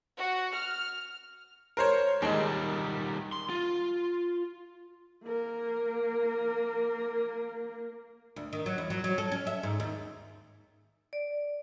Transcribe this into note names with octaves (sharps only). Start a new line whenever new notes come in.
F#4
F6
A#4 C5 C#5
D#2 D#3 G3 G#3
C6
F4
A#3 A#4
D2
D#3
F#3
E2
F#3
F#3
A4
C#4
E5
G#2
D#2
D5